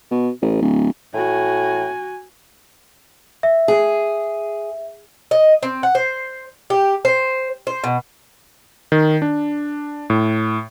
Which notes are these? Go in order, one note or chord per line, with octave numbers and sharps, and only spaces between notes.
B2
A1
D1
A2 F#4 G#5
E5
G#4
D#5
C4
F#5
C5
G4
C5
C5
B2
D#3
D4
A2